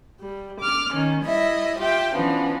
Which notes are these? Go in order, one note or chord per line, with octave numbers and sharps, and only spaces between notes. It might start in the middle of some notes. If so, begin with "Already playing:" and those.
G3
D6 F6
D#3 C#4
G3 E4 D#5 E5
F4 G4 E5 G5
E3 F3 B3 C#4 D4